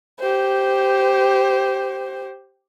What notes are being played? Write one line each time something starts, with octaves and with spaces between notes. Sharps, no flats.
G4 C5